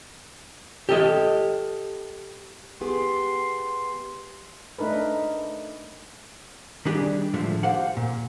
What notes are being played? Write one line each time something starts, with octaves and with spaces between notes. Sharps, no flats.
G4 A4 D#5
B3 G4 G#4 C6
A3 D4 D#4 A#4 B4
D#3 G3 D4 G4 G#4 D5
A2 D3 F3 G#3 A3
G4 C5 F5 F#5
A#2